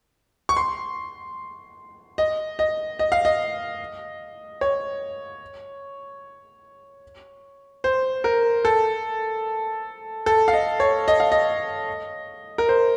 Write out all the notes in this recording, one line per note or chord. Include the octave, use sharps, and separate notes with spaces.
C#6
C6
D#5
D#5
D#5
F5
D#5
C#5
C5
A#4
A4
A4
F5
D#5
C#5
D#5
F5
D#5
A#4
C5